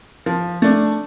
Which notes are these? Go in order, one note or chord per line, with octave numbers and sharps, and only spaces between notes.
F3
A3 D4